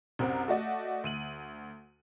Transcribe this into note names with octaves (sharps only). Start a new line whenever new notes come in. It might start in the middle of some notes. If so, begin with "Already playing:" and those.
C2 F#2 C4 A#4 F#5
A3 F#4 D5 D#5
D2 D#7 F#7